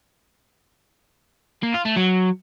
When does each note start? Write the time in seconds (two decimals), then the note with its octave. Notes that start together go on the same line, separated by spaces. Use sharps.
1.63 A#3
1.74 F4
1.85 A3
1.97 F#3